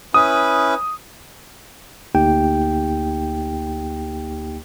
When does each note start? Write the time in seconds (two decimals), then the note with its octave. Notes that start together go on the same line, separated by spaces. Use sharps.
0.14 C#4 E4 B4 D#6
2.15 D2 A#3 D#4 G4 G5